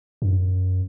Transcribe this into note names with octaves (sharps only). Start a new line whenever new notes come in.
F#2